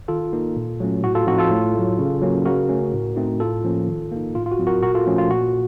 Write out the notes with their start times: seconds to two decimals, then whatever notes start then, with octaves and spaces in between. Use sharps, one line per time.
0.08 D#3 F4 A4
0.33 A#3 D#4
0.57 A#2
0.80 F#3 A3 C#4
1.04 A2 F#4
1.15 F4 A4
1.27 F3 C4 D#4 F#4
1.38 F4 A4
1.51 A2
1.75 F#3 A3
1.99 C#3
2.21 F#3 A#3 C#4
2.45 C#3 F#4 A#4
2.69 A3 C#4
2.93 A2
3.16 A3 C4 D#4
3.40 A2 F4 A4
3.64 F3 A#3 C#4
3.88 D#3
4.12 A#3 D#4
4.35 A2 F4
4.46 F4
4.52 F#4
4.59 F#3 C4
4.67 F#4 A#4
4.82 A#2 F#4 A#4
4.95 F4 A4
5.06 F3 A3 C#4
5.18 F4
5.29 A#2 F#4